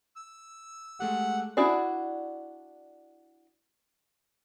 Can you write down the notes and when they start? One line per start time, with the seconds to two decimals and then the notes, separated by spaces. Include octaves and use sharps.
0.16 E6
1.00 G#3 A3 G4 F#5
1.57 D4 E4 F#4 G#4 D5